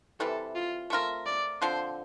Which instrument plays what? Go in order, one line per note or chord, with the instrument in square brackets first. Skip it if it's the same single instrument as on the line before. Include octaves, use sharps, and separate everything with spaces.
[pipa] C3 E3 G3 [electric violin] A4
[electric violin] F4
[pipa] A3 C4 F4 A#4 [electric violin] E5
[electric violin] D5
[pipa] D3 F3 C4 [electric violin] C5